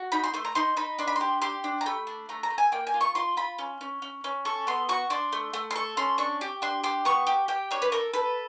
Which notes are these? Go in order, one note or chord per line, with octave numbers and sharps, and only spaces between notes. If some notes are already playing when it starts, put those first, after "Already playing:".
Already playing: F#4
D#4 B5
C6
A3 C6
A#5
D#4 C6
D#4 B5
D4 C6
B5
G4 C6
G4 C6
D4
A#5
A3 B5
D4
A3 A#5
A#5
A3
G#5
A#3 G5
G#5
F4
C#6
F4 C6
F4 B5
C#4
C#4
C#4
C#4
A4 C#6
B3 C6
F#4 C#6
D4 C6
A3
A3
C6
A4 C#6
C#4 C6
D4 C#6
G4
D4 C6
G4 C6
B3 C#6
G4
G4 G5
D4 C#5
B4
A4 A#4
A4 B4